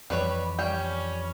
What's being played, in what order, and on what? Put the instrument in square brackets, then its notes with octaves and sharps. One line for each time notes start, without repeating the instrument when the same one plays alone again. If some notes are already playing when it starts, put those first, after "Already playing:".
[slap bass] F2 E3 [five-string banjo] G3 B4 C#5
[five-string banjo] G3 G5 [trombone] C#4